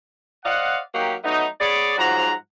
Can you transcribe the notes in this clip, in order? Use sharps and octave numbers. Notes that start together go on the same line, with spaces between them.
C5 D5 D#5 F5 F#5
F#3 A#3 D#4 G4
F#3 A3 B3 D#4
B3 G#4 C#5 D5
G#2 F3 F#3 F#5 A#5